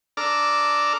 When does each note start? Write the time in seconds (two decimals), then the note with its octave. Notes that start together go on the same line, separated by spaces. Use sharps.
0.17 D4 A4 A#5 D6 F6